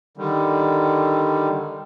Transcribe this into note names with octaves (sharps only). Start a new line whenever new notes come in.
D3 D#3 G3